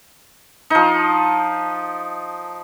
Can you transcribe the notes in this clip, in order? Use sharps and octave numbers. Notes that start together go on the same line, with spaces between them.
F3 D#4